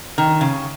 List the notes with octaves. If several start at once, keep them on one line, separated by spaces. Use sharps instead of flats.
D#3
C#3